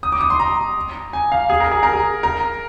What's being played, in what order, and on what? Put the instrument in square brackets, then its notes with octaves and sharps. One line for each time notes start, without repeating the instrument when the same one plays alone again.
[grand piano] D#6
D6
D#6
C6
A#5
G#5
F5
G#4
A#4
G#4
A#4
G#4
A#4